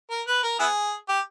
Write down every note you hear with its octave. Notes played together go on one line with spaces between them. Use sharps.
A#4
B4
A#4
B3 E4 G#4
G4